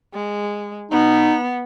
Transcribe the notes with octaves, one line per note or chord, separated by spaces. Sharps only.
G#3
B3 D#4